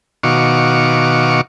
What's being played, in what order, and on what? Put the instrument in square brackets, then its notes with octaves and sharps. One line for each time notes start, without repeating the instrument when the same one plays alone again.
[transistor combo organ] B2 D#3 F#4 F5 C#6 D6